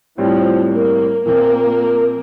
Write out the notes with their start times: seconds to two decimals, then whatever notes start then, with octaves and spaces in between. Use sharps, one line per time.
0.18 A2 F3 G3 C4
0.72 A#3
1.26 A#2 F3 A#3 C4